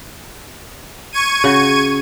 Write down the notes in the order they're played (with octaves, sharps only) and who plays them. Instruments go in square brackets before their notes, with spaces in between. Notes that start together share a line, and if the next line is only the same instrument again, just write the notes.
[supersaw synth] C#6 G#6 D#7
[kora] C#3 F#4